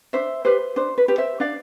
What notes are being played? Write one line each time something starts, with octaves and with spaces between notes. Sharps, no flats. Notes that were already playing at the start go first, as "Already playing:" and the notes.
D4 C5 E5
G4 B4 C5
D4 C5
B4
G4 B4
C5 E5
D4 D5 F5